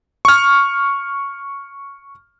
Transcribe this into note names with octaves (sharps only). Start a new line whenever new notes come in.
C#6 F6